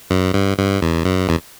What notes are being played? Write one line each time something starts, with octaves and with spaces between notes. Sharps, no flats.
F#2
G2
G2
E2
F#2
E2